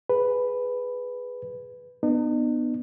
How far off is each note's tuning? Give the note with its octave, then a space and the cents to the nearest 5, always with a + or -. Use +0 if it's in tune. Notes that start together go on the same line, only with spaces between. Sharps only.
G#4 +0 B4 +0
B3 +0 D#4 -45